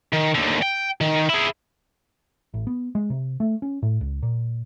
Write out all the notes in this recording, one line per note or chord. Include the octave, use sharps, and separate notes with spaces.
D#3
D#2 D3
G5
D#3
E4 G#4
A1
B3
G#3
C3
A3
C#4
A2
C#2
A#2